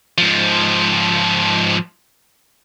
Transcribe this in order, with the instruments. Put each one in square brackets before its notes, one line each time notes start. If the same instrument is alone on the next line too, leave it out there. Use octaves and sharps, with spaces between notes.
[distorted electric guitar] G#2 F3